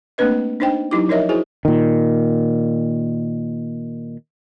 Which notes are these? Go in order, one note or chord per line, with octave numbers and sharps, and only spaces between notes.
A3 A#3 C4 D4 B4 D#5
D4 D#4 C5 D#5 G5
F#3 C#4 D#4 E4 G4 D6
F3 D#4 A#4 C#5 D#5 E5
E4 F#4 G#4 C5 G#5
A#2 D#3